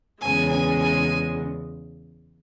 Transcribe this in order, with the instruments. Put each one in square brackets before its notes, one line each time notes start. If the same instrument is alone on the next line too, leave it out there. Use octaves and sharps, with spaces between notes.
[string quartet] E2 C#3 G#3 G#5
G#5
G#5